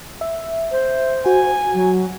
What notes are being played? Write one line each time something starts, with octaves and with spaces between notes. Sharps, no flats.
E5
C5
F#4 G#5
F#3